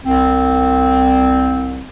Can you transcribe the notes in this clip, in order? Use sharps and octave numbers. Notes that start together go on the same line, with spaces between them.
C2 C4